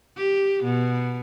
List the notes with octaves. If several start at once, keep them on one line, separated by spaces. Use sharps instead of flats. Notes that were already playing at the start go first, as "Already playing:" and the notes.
G4
B2